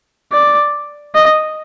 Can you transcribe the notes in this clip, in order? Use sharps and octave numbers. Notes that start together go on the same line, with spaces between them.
D5
D#5